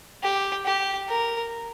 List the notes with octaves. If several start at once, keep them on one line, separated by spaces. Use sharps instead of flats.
G4
G4
A#4